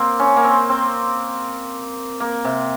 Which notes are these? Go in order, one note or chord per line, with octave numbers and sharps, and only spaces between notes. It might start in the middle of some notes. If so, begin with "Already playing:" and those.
Already playing: A#3 C4
C#4
A#3
C4
C4
A#3
C3